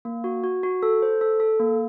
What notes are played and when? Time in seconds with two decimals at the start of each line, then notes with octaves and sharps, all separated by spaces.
0.05 A#3
0.24 F#4
0.44 F#4
0.63 F#4
0.83 A4
1.02 C5
1.21 A4
1.40 A4
1.60 A#3